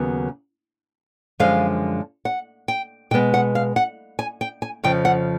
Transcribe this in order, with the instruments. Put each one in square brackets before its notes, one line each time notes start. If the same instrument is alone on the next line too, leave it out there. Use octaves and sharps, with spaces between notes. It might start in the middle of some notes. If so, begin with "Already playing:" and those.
Already playing: [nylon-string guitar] D#2 C#3 F#3 B3
F#2 D3 F3 G#3 F5
F#5
G5
B2 G5
G#3 B3
F#5
F5
F#5
G#5
G5
G#5
F2 C#3 F3 G5
F#5